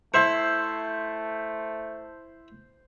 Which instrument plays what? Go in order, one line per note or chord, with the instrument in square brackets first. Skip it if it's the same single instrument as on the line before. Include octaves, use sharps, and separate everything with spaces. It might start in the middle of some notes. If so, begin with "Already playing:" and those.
[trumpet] A3 [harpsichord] E4 E5 C#6 [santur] C5